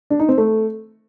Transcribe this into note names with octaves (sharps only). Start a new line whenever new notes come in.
D4
D#4
C4
A3